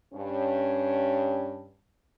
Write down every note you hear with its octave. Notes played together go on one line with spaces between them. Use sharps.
G2 C#4